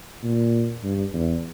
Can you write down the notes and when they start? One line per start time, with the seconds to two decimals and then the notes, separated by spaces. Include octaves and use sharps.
0.23 A#2
0.83 G2
1.14 E2